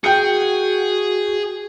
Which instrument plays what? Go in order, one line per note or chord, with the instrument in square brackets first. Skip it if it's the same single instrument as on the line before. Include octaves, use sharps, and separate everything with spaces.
[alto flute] F#4 [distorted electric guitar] G#4 [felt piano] G5 G6 C#7